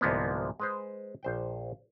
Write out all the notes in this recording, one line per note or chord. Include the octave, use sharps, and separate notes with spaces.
C2 G#2 D3 F3 A#3 B3
G#3 B4 C5
A#1 C5 G5